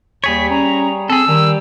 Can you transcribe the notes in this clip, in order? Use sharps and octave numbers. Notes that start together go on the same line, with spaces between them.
D#2 G3 G#4 C#5 B6
C#4 A#5
C4 G#4 A4 E6
D#3 G3